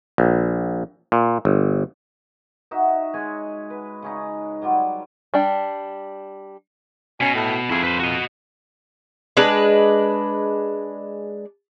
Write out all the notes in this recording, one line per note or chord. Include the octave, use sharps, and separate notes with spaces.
A#1
A#2
G1
D#4 F#4 E5
G#3 C#5 G#5
B4
C#3 C#4 D#4
F#3 G3 F4 D5
G3 D4 G5
B2 C#4
A2
F2 E4 G#4
B4 C5
F#4 D#5
G#3 D4 B4